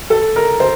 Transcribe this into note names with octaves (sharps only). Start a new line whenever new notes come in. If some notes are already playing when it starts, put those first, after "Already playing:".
A4
A#4
C5